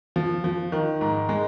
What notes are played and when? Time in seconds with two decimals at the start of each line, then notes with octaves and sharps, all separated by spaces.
0.16 F3
0.44 F3
0.72 D#3
1.01 G#2
1.29 G#3